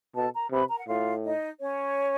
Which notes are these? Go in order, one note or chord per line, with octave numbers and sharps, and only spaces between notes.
B2 A4 A5
A#4 A#5
C3 B4 B5
A#4 A#5
F#5
A2 F4 F5
D#4 D#5
C#4 C#5